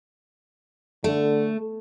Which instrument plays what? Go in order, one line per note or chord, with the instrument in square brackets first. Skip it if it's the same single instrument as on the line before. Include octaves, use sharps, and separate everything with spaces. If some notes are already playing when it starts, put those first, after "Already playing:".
[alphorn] D3 [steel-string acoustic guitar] A3